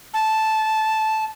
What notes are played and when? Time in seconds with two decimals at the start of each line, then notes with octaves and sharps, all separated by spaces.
0.14 A5